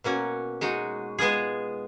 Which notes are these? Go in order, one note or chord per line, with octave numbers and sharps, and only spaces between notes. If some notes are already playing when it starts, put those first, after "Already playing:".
B2 A#3 C#4 F#4
G#3 D#4 F#4
G#3 B3 F4 G#4